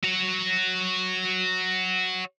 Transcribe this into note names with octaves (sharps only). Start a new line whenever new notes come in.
F#4 C#5